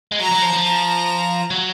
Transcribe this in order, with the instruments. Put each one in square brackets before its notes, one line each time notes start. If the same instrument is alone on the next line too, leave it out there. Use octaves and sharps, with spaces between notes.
[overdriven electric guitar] G#3
[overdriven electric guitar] F#3 [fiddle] A#5
[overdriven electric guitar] F#3
F3
F3
[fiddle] A#5
[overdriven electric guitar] F#3